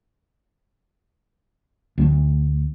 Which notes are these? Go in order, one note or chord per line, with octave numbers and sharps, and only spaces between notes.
D2 G3 A3